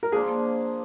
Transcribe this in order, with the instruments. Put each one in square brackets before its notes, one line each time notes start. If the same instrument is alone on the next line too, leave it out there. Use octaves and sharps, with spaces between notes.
[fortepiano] A#4
[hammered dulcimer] F3 A#3 D4 [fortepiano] G#4